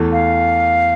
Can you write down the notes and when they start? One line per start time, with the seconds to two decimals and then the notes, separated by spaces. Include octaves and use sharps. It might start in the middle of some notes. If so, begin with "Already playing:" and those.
Already playing: E2 E3 A3
0.12 F5